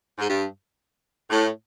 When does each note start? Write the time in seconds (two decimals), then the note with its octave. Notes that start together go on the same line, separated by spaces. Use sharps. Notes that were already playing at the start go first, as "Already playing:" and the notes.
0.18 G#2
0.28 G2
1.30 A2